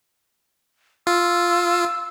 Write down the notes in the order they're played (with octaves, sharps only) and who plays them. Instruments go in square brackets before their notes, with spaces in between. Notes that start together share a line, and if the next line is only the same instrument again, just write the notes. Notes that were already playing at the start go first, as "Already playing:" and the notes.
[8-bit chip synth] F4 [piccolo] E6